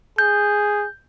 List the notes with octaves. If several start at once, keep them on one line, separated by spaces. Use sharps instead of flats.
G#4 G6